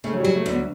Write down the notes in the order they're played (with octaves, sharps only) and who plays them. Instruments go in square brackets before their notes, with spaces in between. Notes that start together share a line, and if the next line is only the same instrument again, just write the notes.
[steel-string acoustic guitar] C#3 [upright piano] A3
[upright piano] F#3
G3
[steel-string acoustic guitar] F#3
[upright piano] A3
[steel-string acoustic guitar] D2
[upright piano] B3